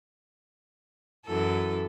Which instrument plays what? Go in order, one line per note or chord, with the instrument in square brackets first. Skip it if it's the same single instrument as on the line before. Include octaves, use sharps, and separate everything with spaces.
[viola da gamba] F#2 E3 A4